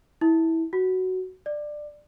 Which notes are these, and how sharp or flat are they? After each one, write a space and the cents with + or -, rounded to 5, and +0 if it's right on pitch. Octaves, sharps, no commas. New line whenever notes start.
E4 -20
F#4 +10
D5 +15